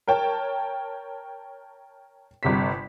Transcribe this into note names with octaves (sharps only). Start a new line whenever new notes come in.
A#4 C#5 G5 A5
G1 C3 B6